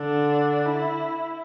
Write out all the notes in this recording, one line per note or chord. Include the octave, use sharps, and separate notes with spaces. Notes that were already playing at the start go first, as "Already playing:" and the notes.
Already playing: D3 D4
E4